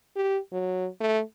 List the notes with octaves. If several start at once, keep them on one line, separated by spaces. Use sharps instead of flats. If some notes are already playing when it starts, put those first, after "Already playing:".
G4
F#3
A3